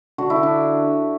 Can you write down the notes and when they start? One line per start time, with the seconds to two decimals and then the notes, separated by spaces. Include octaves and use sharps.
0.18 D3 F#4
0.30 E4
0.36 D3
0.43 D4